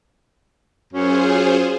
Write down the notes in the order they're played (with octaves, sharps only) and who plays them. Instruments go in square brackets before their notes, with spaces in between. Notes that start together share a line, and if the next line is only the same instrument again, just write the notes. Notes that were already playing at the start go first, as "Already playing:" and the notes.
[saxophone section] F#2 C#4 [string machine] F4 G#4 C5